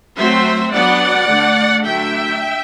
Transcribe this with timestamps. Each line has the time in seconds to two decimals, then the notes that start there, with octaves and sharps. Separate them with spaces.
0.16 F#3 A3 C4 C5 E5
0.73 F#3 B3 D4 D5 F#5
1.29 D3 A3 D4
1.85 D3 F#3 A3 D4 E5 G5